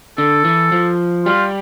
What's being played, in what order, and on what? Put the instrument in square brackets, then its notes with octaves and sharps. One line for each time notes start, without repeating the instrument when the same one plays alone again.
[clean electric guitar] D3 [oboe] A4
[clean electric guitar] E3
F3
[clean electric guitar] G3 [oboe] F4